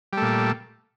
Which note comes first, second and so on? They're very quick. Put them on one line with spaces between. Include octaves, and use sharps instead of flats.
G3 A3 A#2